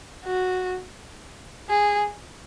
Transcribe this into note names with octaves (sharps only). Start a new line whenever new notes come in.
F#4
G#4